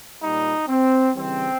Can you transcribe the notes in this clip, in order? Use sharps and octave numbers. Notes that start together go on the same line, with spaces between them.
A#2 G3 D#4
C4
C#3 E3 G3 C4